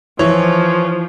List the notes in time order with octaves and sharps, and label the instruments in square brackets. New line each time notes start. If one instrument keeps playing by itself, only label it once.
[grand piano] E3 C#5 [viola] F3